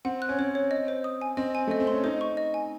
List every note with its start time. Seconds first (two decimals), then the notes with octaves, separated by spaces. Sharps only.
0.05 C4 F#5
0.22 F#6
0.29 C#4
0.39 C4 C#5
0.55 C#5
0.71 D#5
0.88 C5
1.04 D#6
1.21 G#5
1.37 C4 D#5
1.55 G#5
1.67 A3 D#5
1.80 C4
1.87 C#4 C6
2.04 D#4 C5
2.21 C#6
2.37 D#5
2.54 G#5